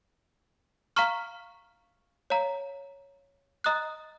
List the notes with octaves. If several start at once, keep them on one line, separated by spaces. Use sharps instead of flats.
F5 A#5 C#6 F6
C#5 F5 A#5
D#5 A#5 D#6 F#6